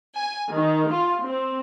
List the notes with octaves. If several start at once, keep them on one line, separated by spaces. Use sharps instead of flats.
G#5
D#3
F4
C4